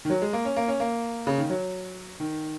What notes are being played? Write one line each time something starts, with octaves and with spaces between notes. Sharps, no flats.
D#3
F#3
G#3
A#3
C#4
A#3
C#4
A#3
C#3
D#3
F#3
D#3